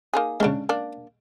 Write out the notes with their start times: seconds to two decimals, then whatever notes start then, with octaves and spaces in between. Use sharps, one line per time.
0.13 A#3 D#4 G#4
0.40 C#3 G#3 C#4 D4
0.69 A#3 D4 D5